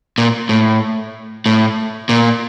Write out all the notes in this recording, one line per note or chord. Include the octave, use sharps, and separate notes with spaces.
A#2
A2
A2
A#2